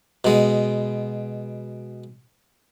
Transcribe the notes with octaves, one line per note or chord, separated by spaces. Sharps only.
B2 G#3